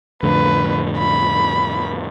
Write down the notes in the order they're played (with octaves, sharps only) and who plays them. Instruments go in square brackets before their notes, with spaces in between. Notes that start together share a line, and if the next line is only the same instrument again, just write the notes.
[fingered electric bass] F2 A2 D3 [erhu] B4
[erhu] B5